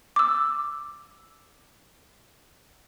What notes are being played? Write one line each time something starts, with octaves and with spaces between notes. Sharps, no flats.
D6 E6